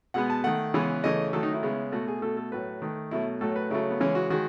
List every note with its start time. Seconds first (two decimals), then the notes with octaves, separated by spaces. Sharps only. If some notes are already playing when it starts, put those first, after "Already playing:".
0.14 B2 G#3 B3 F#5
0.30 A5
0.44 D#3 A3 F#5
0.74 C#3 E3 G#3 B3
1.04 C#3 E3 A3 D#5
1.33 D#3 F#3 A3 A4
1.43 D#4
1.53 E4
1.63 C#3 G#3 B3
1.92 B2 A3 F#4
2.08 G#4
2.22 B2 A3 A4
2.37 A4
2.52 A2 F#3 A3 B4
2.82 D#3 A3
3.11 B2 F#3 A3 E4
3.41 A2 F#3 A3 A4
3.56 B4
3.70 C#3 F#3 A3 E4
3.90 B3
4.00 C#3 E3 G#3 C#4
4.15 F#4
4.30 D#3 G#3 F#4